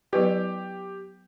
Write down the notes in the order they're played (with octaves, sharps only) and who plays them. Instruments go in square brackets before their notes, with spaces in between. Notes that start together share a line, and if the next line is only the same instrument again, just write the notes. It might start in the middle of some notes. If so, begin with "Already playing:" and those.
[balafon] F#3 B3 E4 B4 D5 [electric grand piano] G4